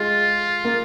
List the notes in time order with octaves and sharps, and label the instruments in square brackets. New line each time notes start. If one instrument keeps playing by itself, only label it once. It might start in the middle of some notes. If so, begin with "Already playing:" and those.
Already playing: [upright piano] G#3 [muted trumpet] F4
[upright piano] A#3